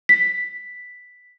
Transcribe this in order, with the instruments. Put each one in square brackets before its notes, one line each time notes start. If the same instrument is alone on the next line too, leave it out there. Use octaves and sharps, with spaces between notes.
[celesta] B6